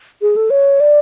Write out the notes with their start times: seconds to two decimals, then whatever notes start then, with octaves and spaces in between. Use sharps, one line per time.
0.22 G#4
0.36 A4
0.50 C#5
0.80 D5